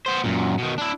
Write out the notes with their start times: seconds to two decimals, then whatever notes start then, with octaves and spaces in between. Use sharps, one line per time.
0.06 B3 C5
0.24 F#2 A#2
0.58 B2 D#3
0.78 D4 E4